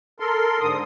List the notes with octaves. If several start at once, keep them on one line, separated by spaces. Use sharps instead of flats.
A4 A#4 C6
G#2 D3 D#6